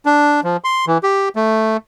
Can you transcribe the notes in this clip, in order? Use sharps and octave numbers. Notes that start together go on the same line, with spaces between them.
D4
F3
C6
E3
G4
A3